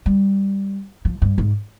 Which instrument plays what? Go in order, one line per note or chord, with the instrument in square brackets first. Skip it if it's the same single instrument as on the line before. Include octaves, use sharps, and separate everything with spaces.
[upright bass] G3
F3
G2
G#2